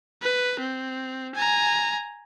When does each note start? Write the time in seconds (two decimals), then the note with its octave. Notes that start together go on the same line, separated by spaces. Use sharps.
0.22 B4
0.60 C4
1.35 G#5 A#5